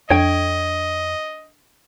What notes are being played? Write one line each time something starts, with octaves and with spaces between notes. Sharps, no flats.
F2 D4 A4 C#5 D#5 G5 G#6